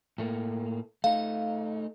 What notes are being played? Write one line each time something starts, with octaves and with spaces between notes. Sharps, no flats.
A2 A3 A#3
A3 D#4 F5